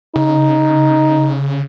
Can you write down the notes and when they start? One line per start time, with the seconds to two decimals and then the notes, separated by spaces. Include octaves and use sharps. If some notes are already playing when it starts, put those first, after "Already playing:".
0.16 C#3 D#4